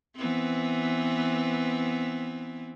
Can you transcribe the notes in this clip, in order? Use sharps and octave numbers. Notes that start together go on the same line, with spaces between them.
E3 B3 C4